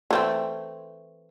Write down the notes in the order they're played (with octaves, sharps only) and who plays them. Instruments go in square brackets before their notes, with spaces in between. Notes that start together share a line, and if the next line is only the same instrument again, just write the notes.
[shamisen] E3 A3 C4